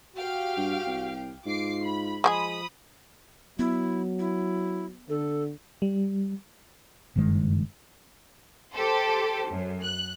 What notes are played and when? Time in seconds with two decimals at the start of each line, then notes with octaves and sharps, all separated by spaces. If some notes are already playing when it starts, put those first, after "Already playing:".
0.16 F#4 G4 F5 G5
0.57 G2
0.87 C2
1.46 G#2 F4 D6 C7
1.84 B5
2.24 F3 G#3 G4 G#4 B5 D#6
3.59 F#3 B3 E4
4.19 E4
5.10 D3 A4
5.82 G3
7.16 F#1 G2 D#3 G#3
8.73 G4 A4 C5
9.49 F#2
9.84 F#6